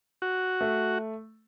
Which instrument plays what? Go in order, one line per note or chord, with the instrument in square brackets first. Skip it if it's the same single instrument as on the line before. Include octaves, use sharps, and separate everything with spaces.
[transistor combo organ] F#4
[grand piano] A3